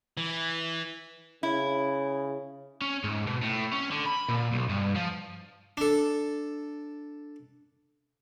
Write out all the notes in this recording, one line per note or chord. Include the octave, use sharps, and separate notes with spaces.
E3
C#3 E4
C#4
G#2
B2
A2
C#4
D3
B5
A#2
B1
G2
F3
D4 A4